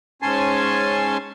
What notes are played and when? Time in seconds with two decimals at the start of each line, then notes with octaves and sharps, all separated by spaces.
0.22 G#2 C#4 G#5 A5 C6